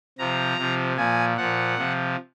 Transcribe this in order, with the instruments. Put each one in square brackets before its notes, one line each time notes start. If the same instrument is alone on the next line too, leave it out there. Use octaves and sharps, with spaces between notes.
[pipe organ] C3 F3 A#5
C3 F3
A#2 F3 G#5
A#2 F3 F#5
C3 F3